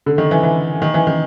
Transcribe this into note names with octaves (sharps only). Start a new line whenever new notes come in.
D3
D#3
E3
E3
D#3
E3
D#3